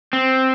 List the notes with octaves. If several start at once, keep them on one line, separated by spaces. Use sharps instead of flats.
C4